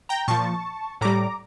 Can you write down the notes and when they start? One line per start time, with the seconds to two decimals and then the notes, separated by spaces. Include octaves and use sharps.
0.09 G5 A#5
0.28 A#2 F3 A5 C#6
1.01 A2 G3 A#5 D6